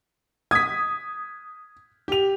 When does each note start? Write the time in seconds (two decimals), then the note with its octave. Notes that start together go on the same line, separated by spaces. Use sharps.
0.51 D#6 G#6 B6
2.08 G4 F7